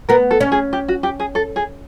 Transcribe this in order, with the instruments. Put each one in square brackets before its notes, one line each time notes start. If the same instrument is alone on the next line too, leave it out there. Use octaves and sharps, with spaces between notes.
[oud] B3 [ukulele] A#4
[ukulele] A4
[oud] C#4
[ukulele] G#4
G4
F#4
G4
G#4
A4
G#4